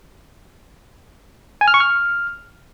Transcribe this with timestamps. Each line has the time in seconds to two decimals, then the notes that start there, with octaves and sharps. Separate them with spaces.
1.61 G#5
1.68 F6
1.74 C#6
1.80 F6